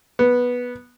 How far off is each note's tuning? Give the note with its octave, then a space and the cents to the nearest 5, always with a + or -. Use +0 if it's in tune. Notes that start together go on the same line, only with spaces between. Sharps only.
B3 -10